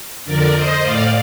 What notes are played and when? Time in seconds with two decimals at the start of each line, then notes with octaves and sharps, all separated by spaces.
0.25 F2 D3 A#4 D5
0.53 C5 D#5
0.82 A2 D5 F5